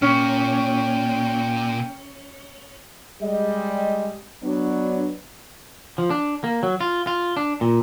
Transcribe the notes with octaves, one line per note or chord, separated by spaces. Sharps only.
A#2 C#4 G5 F6
G3 G#3 D#5
F#3 B3 D4
F3
D4
A#3
F#3
F4
F4
D4
A#2